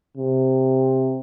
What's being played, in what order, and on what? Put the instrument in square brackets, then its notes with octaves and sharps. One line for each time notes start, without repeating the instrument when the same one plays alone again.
[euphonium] C3